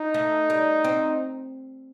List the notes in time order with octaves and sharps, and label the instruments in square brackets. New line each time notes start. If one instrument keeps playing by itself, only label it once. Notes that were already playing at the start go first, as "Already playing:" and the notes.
Already playing: [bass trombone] D#4
[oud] A3
G3
C4